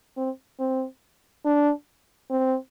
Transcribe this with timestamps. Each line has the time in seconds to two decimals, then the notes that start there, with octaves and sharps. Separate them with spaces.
0.17 C4
0.59 C4
1.45 D4
2.30 C4